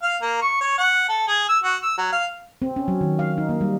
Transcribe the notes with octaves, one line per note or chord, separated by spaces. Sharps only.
F5
A#3
C#6
C#5
F#5
A4
G#4
E6
F#4
E6
F#3
F5
C4
C#4
F#3
D#3
F5
D#4
A#3
G3